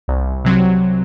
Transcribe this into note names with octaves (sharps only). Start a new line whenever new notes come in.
C2
C3 F#3 C4